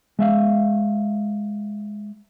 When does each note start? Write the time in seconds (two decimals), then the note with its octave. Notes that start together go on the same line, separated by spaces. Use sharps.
0.19 G#3 E5 F5